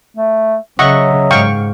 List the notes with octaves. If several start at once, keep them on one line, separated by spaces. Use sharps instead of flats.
A3
C#3 F#3 D#5 E5 F#5 C#6
G#2 F5 G5 C#6